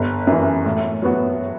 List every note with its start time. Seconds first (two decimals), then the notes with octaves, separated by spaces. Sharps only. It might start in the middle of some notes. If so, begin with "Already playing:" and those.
Already playing: G1
0.27 F#2 E3
0.65 A2
1.02 F#3 B3 F#4